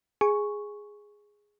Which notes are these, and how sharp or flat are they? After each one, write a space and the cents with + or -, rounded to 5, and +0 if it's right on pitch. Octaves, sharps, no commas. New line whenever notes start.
G#4 +0 G#5 +0 C#6 +0